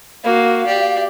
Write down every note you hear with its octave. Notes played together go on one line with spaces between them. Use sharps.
A#3 F#4 F5
G4 D5